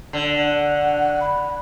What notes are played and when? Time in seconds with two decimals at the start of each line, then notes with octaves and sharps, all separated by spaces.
0.13 D3
0.35 F#5
1.20 B5